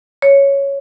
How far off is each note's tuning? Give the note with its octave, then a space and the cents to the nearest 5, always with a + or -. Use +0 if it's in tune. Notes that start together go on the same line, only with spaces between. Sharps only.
C#5 +0